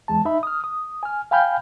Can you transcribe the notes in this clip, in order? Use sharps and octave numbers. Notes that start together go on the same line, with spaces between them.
E2 G#3 A5
D#4 E5 B5
D#6 F6
D#6
G#5 F6
F5 G5 G#5 B5 F6 G6